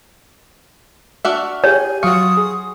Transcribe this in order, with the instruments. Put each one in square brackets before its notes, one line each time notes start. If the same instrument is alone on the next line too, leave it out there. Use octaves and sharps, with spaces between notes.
[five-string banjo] D4 F#4 E5 [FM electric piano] F6
[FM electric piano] G4 G#4 [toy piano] C#5 [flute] G#5
[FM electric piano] F#3 C#6 [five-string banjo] F4 F#4 [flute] D#6
[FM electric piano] G#4